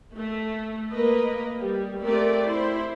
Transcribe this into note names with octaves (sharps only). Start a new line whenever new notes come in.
A3
A#3 B4 D#5
G3
A3 C4 G4 A#4 D5
E4 C5